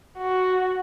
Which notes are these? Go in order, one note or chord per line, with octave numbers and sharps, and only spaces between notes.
F#4